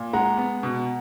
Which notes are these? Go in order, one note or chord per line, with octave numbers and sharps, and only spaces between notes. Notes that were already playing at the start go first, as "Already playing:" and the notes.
Already playing: A#2
G#3 F#5 A#5
B3
B2